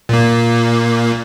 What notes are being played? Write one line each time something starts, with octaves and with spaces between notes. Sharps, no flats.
A#2 A#3